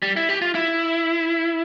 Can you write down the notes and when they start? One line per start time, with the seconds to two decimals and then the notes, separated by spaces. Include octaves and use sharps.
0.02 G3
0.16 E4
0.29 G4
0.42 F4
0.55 E4